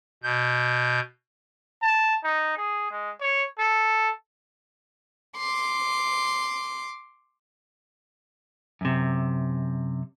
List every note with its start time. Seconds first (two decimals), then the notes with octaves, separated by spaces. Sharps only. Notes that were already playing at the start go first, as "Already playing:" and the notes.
0.23 B2 G6
1.83 A5
2.24 D#4
2.57 G#4
2.91 G#3
3.21 C#5
3.59 A4
5.38 C6 D6
8.81 F#2 C3